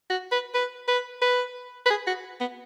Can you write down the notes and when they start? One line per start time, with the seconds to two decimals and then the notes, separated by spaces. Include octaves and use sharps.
0.10 F#4
0.32 B4
0.55 B4
0.88 B4
1.22 B4
1.86 B4
1.90 G#4
2.07 F#4
2.41 B3